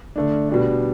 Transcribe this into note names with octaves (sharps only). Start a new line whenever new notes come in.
D3 A3 D4
B2 G3 D4